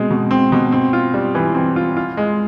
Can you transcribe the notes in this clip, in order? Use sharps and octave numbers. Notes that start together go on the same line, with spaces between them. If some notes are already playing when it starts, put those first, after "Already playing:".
Already playing: B2 G#3 C4
B2
C4
B2
C4
F4
G3
E3
C4
F4
F4
G#3